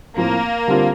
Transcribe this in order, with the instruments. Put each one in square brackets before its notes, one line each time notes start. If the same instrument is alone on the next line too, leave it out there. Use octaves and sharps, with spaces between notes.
[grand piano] A2 F3 C4 [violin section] A#3
[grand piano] D3 G3 C4 F4 A#4